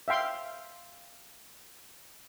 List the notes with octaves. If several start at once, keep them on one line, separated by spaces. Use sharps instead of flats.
E5 F5 G5 C6